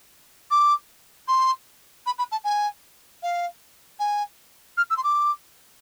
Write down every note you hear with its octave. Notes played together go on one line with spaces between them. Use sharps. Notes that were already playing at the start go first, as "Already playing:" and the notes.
D6
C6
B5
B5
A5
G#5
F5
G#5
F6
E6
C6
D6